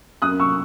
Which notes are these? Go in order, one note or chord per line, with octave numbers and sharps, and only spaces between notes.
F#2 D#6 F#6
C#6 E6